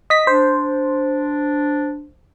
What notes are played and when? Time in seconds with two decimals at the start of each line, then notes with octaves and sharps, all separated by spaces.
0.10 D#5 B6
0.27 D4 C5